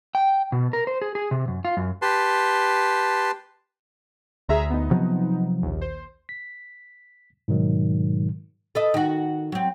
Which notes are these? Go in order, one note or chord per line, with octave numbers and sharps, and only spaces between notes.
G5
B2
A#4
C5
G#4
G#4
C3
F#2
F4
F#2
G4 B4 A5 C6
D2 G#4 E5 A#5
B3 D#4
C3 F3 F#3
A#1 D#2
C5
B6
G#2 B2 D#3 F#3 G#3
A4 B4 D#5
D#3 F#4
F#3 C4